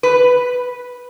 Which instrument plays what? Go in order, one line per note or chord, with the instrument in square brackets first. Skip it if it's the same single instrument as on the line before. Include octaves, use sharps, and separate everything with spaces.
[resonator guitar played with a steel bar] B4